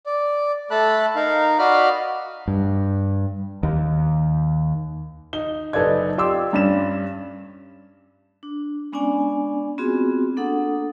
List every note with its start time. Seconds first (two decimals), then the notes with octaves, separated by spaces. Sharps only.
0.06 D5
0.71 A3 A4 A5 B5 F#6
1.16 D#4 A#4 F5
1.59 F#4 D5 D#5 F5 B5 F6
2.48 G2
3.63 D#2
5.33 D#4 G7
5.73 F#1 D#4 A4 B4 D5 G#6
6.17 F4 G4 D5 C6 D6 E6
6.53 G2 C#4 D5 B5 E7
8.43 D4
8.92 G#3 B3 C#4 D4 D5 G#5
9.78 B3 C4 F4 F#4 G#4
10.37 A#3 D4 A4 F#5 D#6